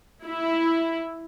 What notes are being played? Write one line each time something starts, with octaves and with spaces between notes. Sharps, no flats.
E4